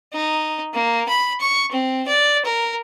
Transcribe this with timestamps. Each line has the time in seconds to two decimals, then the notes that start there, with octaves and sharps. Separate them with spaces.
0.13 D#4
0.74 A#3
1.09 B5
1.40 C#6
1.72 C4
2.07 D5
2.45 A#4